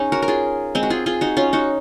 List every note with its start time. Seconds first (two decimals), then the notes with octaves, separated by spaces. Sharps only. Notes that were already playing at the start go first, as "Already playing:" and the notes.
Already playing: C#4 D#4 G#4
0.12 F#4 A#4
0.22 A#4
0.28 F4 G#4
0.75 G#3 C4
0.83 F#4
0.90 F4 G#4
1.06 F4 G#4
1.21 D#4 F#4
1.37 C#4 F4
1.53 D#4 F#4